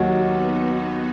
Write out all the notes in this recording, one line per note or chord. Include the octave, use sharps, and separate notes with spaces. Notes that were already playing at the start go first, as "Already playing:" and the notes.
Already playing: D#2 D#3 F#3 D#4 F#4
B3 D#4